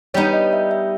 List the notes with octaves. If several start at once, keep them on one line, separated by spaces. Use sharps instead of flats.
G3 B3 D#4 C#5
D#5
E5
E5